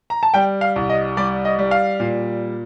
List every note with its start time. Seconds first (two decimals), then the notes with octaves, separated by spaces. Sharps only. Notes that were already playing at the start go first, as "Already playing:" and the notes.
0.10 A#5
0.23 A5
0.34 G3 G5
0.61 F5
0.76 C2
0.89 D#5
1.17 G3 D5
1.45 D#5
1.59 G3
1.71 F5
2.00 A#2